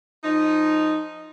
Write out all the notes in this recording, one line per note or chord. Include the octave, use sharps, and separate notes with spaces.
F3 D#4